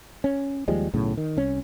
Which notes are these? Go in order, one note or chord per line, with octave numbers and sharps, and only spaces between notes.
C#4
D#2 F3 G3 G#3
B1 A2 C#3
D#3
C2 C#4